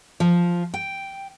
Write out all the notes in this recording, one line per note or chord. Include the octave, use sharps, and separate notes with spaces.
F3
G5